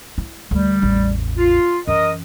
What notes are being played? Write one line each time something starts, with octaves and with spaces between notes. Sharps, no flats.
E4
D2 G3
A1 E2
F4
F#2 E3 A#4 D#5